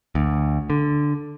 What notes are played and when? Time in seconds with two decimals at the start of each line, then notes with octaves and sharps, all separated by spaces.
0.15 D2
0.70 D3